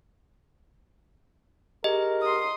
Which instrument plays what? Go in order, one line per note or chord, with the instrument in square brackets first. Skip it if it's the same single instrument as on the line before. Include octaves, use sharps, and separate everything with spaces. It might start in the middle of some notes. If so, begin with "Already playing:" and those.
[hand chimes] G4 G#4 [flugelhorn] A#4 [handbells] D#5
[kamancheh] C6 D#6